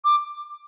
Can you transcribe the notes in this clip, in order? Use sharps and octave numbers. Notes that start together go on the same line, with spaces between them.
D6